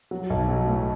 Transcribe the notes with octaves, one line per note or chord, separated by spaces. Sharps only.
F#3
B1
F#3
A2